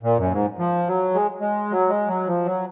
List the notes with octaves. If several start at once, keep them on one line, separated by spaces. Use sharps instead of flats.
A#2
F#2
G#2
F3
F#3
G#3
G#3
F#3
G#3
F#3
F3
F#3